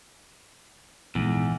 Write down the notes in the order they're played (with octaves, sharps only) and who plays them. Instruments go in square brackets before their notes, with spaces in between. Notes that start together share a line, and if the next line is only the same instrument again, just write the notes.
[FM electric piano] A#1 G#2 [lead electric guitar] E2